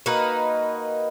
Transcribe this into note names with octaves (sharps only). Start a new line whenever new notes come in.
A#3 D#4 F#4 B4